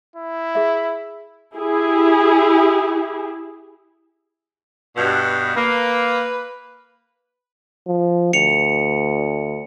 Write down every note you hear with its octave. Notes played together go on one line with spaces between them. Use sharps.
E4
G#4 E5
E4 G4 G#4
G2 B2
A#3 B4
F3
D2 C#7 F7